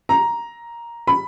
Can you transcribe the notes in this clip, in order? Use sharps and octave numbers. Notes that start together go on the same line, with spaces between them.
A#5
B5